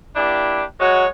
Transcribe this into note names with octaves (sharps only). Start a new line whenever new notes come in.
A#3 D4 E4 G4
F#3 G#3 F#4 C#5